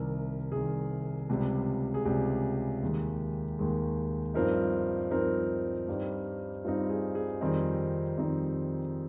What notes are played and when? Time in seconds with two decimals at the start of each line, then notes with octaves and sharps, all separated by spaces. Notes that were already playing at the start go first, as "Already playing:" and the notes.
Already playing: C2 C3 D#3 A#4
0.52 C2 C3 D#3 G#4
1.29 C#2 C3 G3
1.94 G#4
2.05 C#2 C3 G3 G4
2.82 D#2 D#3 G#3
3.59 D#2 D#3 G#3
4.34 G2 F3 C4 D#4 A#4
5.11 G2 F3 C4 D#4 A#4
5.88 G2 G3 C4 D#4
6.65 G2 G3 C4 D#4 F4
6.90 G#4
7.15 G#4
7.41 F2 D#3 G3 C4 D#4
8.17 F2 D#3 G3 C4 D#4